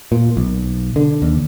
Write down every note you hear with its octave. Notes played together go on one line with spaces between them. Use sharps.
A#2
B1
D3
D#2